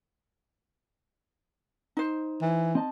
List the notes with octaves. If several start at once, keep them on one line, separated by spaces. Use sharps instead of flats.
D#4 C5
E3
C4 D#5 A5